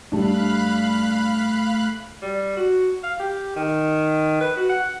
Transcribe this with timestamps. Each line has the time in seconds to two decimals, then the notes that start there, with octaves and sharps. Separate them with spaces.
0.12 G2 G3 A3 D4 F5 B5 F#6
2.22 G3
2.57 F#4
3.03 F5
3.19 G4
3.56 D#3
4.41 B4
4.56 F#4
4.69 F#5